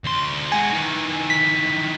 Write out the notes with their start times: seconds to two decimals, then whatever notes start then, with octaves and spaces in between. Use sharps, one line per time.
0.04 D2 C6
0.52 G#3 F#4 G#5
0.72 D#3 E3
1.30 B6